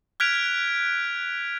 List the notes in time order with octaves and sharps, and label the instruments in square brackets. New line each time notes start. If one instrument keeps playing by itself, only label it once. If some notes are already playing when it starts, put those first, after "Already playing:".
[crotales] F6 F#6 G#6 B6 D7 F7